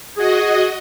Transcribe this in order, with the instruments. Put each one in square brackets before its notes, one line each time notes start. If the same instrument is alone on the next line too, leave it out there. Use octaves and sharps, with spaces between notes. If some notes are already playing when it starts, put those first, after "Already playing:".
[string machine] F#4 D#5 [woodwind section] G#4